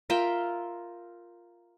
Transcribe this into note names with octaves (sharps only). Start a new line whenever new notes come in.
F4 A#4 E5 G5